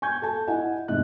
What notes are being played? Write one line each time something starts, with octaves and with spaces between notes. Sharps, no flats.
G#5 C#6 G6 G#6
A4 G#5 A5
E4 D#5 F#5 G#5
E2 G#2 C3 D#5 F#6